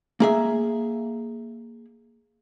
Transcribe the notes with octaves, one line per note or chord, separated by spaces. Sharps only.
A#3 G#4 E5